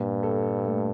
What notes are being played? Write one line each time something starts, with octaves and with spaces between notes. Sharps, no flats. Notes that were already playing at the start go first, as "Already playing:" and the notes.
Already playing: G2 A#2
A4
A3